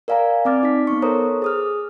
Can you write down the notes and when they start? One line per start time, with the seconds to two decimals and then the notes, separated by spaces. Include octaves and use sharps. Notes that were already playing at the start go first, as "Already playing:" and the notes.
0.08 A#4 D5 F5 G#5 A#5
0.45 C4 D5 D6 F6 A6
0.63 D#4 B6
0.87 B3 C#6
1.02 A4 A#4 C5 C#5 A#5 D#6
1.42 G#4 D#6 F6